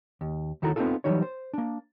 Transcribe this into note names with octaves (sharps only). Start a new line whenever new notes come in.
D#2
D#2 D#3 E4 F#4 A4 A#5
B3 C4 D4 D#4 F4 A4
E3 F#3 G3 D#4 C#5
C5
A#3 D4